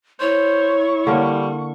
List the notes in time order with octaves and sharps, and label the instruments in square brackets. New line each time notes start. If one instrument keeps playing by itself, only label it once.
[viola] E4 C#6 [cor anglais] C5 [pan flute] C#5
[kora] D3 A#3 [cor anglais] G3